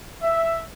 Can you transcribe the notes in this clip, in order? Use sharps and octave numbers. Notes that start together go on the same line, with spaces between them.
E5